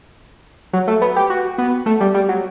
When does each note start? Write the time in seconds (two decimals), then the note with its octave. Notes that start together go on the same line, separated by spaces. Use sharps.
0.73 F#3
0.88 A3
1.02 B3
1.16 G4
1.30 F#4
1.58 B3
1.86 A3
2.00 G3
2.14 G3
2.29 F#3